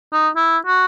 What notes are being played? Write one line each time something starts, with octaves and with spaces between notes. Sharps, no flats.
D#4
E4
F#4